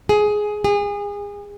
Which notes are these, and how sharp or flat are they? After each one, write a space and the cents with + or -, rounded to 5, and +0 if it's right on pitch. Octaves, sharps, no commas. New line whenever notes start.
G#4 +10
G#4 -30